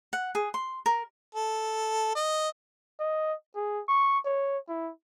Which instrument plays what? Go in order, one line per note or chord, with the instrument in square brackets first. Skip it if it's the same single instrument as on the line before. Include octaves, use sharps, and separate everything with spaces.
[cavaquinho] F#5
G#4
C6
A#4
[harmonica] A4
D#5
[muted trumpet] D#5
G#4
C#6
C#5
E4